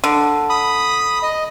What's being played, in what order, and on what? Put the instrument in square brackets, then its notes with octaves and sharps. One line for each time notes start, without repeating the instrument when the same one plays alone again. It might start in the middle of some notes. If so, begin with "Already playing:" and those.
[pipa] D3
[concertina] B5 D#6
D#5